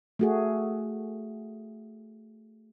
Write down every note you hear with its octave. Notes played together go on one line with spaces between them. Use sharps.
A3 F#4 G#4